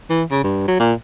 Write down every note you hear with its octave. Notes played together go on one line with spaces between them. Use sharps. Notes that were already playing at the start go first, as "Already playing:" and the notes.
E3
C#3
G2
F#3
A#2